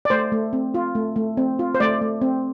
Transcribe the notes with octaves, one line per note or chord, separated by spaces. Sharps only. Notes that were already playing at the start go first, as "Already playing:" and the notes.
D5
A3 C5
A3
C4
F4
A3
A3
C4
F4
C5
A3 D5
A3
C4